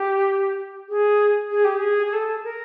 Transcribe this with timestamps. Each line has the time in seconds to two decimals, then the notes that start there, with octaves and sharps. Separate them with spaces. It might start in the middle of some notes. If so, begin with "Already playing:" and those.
Already playing: G4
0.89 G#4
1.51 G#4
1.65 G4
1.78 G#4
2.06 G#4
2.13 A4
2.44 A#4